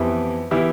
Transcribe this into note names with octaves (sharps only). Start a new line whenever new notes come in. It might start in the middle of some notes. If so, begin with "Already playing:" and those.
Already playing: F2 E3 B3 E4 G4
E3 B3 E4 G4